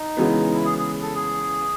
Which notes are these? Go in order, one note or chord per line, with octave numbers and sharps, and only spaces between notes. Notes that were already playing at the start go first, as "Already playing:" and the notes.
Already playing: D#4
C#3 E3 G#3 B3
E4
G#4
G#4
A4
G#4